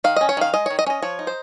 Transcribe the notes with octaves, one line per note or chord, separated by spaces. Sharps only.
D#3 F5
C#4 D#5
C#5
D#3 F5
G#3 D#5
D#3 C#5
D#5
C#4 C#5 D#5
F3 C#5
D#4
C5